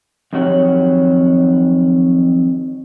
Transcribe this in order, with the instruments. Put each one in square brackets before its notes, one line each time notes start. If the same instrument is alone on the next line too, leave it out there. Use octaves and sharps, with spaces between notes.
[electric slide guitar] F2 D#3 F#3 F#4 G4 C#5